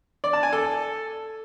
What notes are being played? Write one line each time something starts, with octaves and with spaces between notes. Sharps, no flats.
D5
A5
G#5
A4